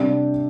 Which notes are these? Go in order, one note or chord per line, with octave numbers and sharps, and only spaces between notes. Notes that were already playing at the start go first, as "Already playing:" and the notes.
Already playing: C3 G3 D4 G4